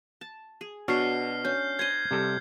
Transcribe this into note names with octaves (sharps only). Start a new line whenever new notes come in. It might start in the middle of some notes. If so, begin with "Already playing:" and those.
A5
G#4
B2 D4 F#4 C#5 F6 C7
C#4 G6
C5 D#5 G#6 C7
C3 G3 A4